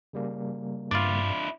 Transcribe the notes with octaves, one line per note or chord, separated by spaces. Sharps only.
C#3 G3 A#3
G2 D4 E4 F4 D5